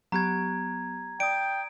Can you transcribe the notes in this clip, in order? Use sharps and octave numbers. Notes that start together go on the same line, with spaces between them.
F#3 B3 G4 A#5 G#6
D5 G5 D#6 D7